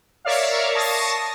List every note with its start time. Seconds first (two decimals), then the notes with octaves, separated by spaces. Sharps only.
0.25 A#4 C#5 D5 E5 F5
0.75 A5 C#6 D#6 A#6 C7